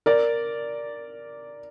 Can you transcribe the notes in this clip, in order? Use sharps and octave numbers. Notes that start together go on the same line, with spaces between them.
A#4 D5